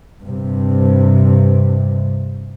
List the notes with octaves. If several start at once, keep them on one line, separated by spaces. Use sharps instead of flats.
G2 C3